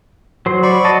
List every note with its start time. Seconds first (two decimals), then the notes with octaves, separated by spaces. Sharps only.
0.46 F#3 C5
0.63 D5 B5 C#6
0.85 F#4 D#5 A5